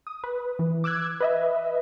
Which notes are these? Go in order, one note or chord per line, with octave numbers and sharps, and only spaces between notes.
D#6
B4
E3
D6 E6 F#6 G#6
B4 D#5 E5